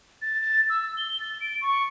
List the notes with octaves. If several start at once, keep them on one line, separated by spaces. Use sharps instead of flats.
A6
A6
E6
G7
A6
D7
C#6